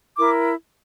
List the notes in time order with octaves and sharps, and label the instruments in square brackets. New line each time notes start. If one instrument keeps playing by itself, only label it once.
[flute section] E4 A#4 D6